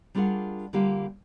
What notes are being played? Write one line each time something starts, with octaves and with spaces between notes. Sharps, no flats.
G3 D4 F4 G#4 A#4 F#5
D3 G3 A#3 F4 G4 F5